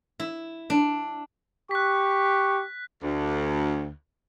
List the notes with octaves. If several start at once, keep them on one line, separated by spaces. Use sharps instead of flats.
E4
D4
G4 C#6 F#6 B6
D2